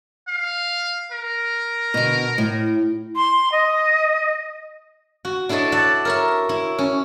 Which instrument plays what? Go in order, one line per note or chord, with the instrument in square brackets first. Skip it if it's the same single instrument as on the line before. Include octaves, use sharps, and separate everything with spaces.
[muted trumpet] F5
A#4
[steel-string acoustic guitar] B2 D3
A2
[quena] C6
D#5
[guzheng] F#4
D4 E4 A4 C#5 D#5
D5 E5 F#5 A5
A#4 C#5 E5
E4
C#4